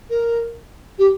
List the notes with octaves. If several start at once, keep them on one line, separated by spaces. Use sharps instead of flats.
A#4
G4